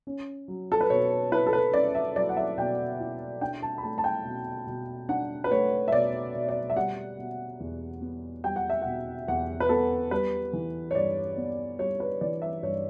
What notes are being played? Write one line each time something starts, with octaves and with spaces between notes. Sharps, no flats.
C#4
F#3
A4
B4
B2 C#5
E4 B4
A4
B4
C#4 D5
E5
F#3 D5
F#5
E5
B2 G5
E4
D4 G5
A5
B5
A3 A5
A5
G5
B2
B2
D4 F#5
B4
A3 C#5
E5
B2 D5
B2
D5
E5
G3 F#5
B2
E2
B3
G3 G5
F#5
E5
B2 F#5
E2 F#5
B4
B3 A4
G3 B4
E3
C#5
G2 D5
B3
G3 C#5
B4
E3 D5
E5
G2 C#5